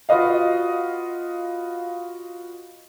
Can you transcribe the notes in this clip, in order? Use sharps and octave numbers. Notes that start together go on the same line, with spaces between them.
F4 F#4 B4 D#5 F5